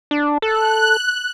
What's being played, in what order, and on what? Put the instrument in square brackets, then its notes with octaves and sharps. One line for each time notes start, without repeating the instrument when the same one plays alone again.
[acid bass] D4
[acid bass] A4 [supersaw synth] F#6